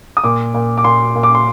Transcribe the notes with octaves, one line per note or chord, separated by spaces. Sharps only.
D#6
A#2 D6
A#2
D6
A#2 C6
A#2
D6
C6